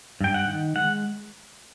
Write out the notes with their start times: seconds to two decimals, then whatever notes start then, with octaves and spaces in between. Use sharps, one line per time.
0.21 G2 G5
0.34 F#5
0.48 D#3
0.76 G#3 F#5